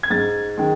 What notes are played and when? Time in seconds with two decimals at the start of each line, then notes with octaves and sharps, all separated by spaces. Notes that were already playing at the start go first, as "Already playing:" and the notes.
0.03 G#6
0.10 G#2 A6
0.58 D#3 G#3